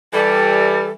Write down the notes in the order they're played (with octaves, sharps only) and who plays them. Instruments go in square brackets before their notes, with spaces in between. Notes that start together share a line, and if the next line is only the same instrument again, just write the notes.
[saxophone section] E3 G3 [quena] A4